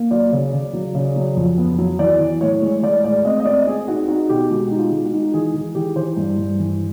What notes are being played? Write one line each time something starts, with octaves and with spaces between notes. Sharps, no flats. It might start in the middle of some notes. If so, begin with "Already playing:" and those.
Already playing: A#3
F#3 D5
C#3
C#3
F#3
C#3
F#3
F2
B3
F#3
E3 D5
E3
A2 C#5
G#3
G#3 D5
A2 D5
C4 D#5
D#5
C4 D5
C4 G#4
D#4 F#4
D#4 F#4
B2 G4
G#3 F#4
D#4
F4
G#3
F#4
D#4
E3 G#4
E3 G#4
E3 G4
E3 C5
G2
G2
E3